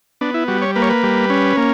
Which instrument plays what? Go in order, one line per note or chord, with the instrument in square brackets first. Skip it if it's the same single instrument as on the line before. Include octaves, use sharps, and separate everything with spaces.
[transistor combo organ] B3 D4
E4
G3 F#4
C#5
A#3 B4
C#5
B4
G3
C#4
A#3